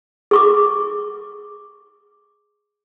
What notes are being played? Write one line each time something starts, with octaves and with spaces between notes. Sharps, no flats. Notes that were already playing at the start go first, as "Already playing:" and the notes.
G#4 C#6 D6